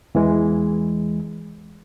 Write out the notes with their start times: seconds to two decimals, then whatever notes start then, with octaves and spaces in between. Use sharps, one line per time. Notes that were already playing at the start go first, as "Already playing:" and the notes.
0.15 E2 E3 G#3